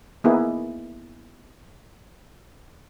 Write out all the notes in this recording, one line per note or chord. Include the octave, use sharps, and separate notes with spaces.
A#3 B3 D#4 E4 G#4